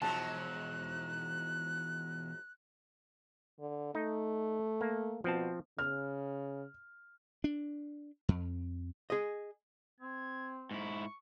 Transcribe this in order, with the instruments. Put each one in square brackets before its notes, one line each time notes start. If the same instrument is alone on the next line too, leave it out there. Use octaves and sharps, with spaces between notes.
[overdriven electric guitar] E2 B2 [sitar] G#2 F3 F#3 [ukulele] A5 [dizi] F#6
[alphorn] D3
[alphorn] A3 [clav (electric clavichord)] D#4
[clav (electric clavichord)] A#3
[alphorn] B2 [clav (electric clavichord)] F3 C4 A5
[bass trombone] C#3 [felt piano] F6
[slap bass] D4
F2
[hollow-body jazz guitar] G#4 D#5
[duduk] C4 [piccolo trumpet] G#6
[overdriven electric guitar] G#2 E4 [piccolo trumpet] C#6